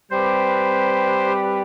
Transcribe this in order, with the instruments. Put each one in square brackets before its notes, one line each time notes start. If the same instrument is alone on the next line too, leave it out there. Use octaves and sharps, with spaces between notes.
[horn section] G3 C4 G4 B4 [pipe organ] C5